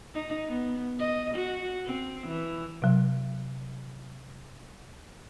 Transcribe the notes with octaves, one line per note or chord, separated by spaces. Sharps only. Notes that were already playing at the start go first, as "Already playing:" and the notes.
D#4
B3
D#5
F#4
C4
E3
C3 F#3